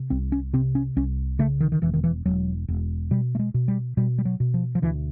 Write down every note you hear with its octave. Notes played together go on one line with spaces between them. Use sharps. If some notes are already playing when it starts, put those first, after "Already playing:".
Already playing: C3
C2 C4
C#4
C3 C4
C#4
C2 C#4
C#3 A3
D#3
D#3
E1 E3
D#3
E3
E1 F#3
E1
B2 G3
A3
G#3
B2
G3
B2 G3
G3
F#3
B2
F3
F3
D2 E3